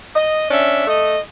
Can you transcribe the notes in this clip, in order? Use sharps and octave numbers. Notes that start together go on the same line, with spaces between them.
D#5
C#4 D4 E5
A3 D#5